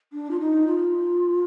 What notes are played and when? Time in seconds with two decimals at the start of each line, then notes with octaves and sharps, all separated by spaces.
0.13 D4
0.31 F4
0.40 D#4
0.67 F4